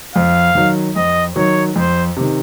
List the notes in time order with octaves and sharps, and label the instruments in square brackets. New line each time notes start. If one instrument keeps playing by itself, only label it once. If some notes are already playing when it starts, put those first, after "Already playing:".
[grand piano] F2 [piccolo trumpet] F5
[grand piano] D#3 F#3
[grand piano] F2 [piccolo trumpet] D#5
[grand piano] D#3 F#3 [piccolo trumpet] C#5
[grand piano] F2 [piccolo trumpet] C5
[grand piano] C3 D#3